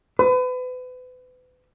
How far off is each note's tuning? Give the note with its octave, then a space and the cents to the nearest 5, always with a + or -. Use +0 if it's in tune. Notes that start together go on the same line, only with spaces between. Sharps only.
B4 +35